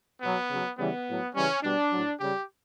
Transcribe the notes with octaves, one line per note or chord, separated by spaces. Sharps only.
B2 F#3 B3
C#3 F#3
C#3 E3 G3 B3
A2 F#3
C#3 E3 G3 C#4
B2 G3 D4
A2 F#3
C#3 G3 G4